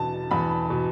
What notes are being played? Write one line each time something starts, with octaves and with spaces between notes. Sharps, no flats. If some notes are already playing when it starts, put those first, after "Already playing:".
Already playing: E2 B2 A5
E2 B5
B2